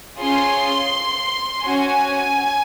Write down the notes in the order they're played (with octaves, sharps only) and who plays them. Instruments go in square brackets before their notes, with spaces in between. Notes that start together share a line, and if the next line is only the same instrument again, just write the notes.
[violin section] C#4 F4 G#4 C6
C#4 F#4 G#5